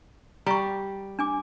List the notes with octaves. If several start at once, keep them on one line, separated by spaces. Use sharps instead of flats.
G3 A#5 C#6
D4 G#5 D6